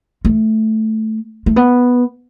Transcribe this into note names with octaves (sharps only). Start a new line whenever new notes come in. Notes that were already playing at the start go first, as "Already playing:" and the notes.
A3
A3
B3